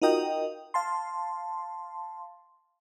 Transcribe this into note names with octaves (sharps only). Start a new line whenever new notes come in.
D#4 F4 F#4 A#4 D#5 G5
F5 A5 C6